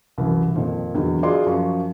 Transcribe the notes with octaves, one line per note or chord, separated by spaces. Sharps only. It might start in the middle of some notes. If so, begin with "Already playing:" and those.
C2 F#2 E3
F2 A#2 D#3
E2 D3 D#3 F#3
F4 F#4 G#4 D5 D#5 C6
F#2 F3 C#6